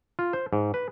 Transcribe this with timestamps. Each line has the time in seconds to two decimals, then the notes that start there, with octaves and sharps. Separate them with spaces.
0.19 F4
0.33 C5
0.53 G#2
0.74 B4